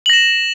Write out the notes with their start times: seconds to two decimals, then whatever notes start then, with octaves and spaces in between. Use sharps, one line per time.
0.06 F#7
0.10 A#6
0.13 E7